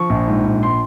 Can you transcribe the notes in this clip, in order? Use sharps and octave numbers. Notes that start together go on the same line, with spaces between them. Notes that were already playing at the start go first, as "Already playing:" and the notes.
Already playing: F3 C#6
A#1
G#2
A#1
C6